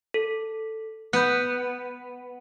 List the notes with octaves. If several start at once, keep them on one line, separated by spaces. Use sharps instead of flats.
A4
B3 F#6 G6